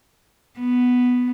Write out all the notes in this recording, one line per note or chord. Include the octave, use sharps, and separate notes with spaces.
B3